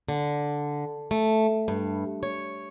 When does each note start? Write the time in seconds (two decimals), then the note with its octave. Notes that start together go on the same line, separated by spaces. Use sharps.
0.09 D3
1.11 A3
1.68 G2
2.23 C#5